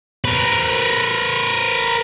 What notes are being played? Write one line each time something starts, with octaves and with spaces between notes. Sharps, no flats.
A#4 B4